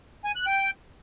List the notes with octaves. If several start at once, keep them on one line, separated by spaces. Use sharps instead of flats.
G#5
F#6
G5